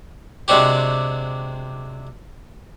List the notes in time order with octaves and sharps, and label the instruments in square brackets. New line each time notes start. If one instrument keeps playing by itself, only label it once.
[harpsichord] C3 G#3 C4 D4 F#4 G4